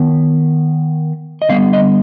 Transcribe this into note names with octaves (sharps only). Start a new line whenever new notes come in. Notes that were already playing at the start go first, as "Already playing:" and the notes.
Already playing: D#3 B3
D#5
D3 G3 B3 F5
D#5